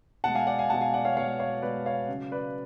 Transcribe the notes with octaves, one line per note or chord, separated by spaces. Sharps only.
B2 G#3 F#5 A5
F5 G#5
D5 F#5
F5 G#5
B2 G#3 F#5 A5
F5 G#5
D5 F#5
C#5 F5
B2 G#3 C#5 F5
C#5 F5
B2 G#3 B4 D5
C#5 F5
C#3 F#3
B4 D5